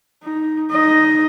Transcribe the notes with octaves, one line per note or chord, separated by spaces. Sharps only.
D#4
D#4 D#5